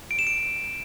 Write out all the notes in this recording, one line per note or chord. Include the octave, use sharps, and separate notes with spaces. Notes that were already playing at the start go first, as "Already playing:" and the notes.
D7
E7
D7